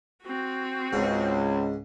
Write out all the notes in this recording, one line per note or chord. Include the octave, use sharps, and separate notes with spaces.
C4 F#4
C#2 G#2